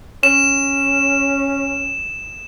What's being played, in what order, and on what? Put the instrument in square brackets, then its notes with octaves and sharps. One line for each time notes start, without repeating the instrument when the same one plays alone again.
[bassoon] C#4 [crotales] E7